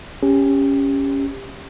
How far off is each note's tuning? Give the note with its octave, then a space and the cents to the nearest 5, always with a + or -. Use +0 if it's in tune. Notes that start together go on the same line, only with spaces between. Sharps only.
C#4 +0 G4 +20